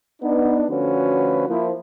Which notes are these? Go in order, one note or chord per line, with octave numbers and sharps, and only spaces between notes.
B3 D4 D#4
D2 D3 F3 C#4 F#4 B4
F3 A#3 E4